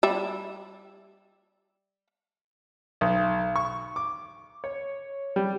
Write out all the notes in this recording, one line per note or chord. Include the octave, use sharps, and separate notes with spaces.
G3 E5
B1
C#6
D6
C#5
G3